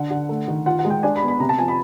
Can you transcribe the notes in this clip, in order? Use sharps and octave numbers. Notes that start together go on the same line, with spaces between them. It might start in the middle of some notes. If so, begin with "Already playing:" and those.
Already playing: D3 F#5
D3
A3
D#3
F4 F#5
F#5
G#3
G5
D4 G#5
B5
B3
B5
C3 A#5
A5
F3 G#5
B5